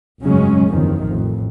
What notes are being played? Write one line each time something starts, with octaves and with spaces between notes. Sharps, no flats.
F1 G2 C#3 F#3 G#3 C#4
F#1 E2 C3 D#3 F3
A1 F2